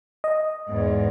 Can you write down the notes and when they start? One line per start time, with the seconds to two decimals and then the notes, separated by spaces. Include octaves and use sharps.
0.24 D#5
0.68 E2 G#2